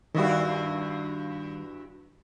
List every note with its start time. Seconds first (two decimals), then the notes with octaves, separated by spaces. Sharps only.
0.15 G2 D#3 G3 E4 F#4